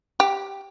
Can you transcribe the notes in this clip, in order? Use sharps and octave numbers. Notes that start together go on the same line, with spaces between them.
G4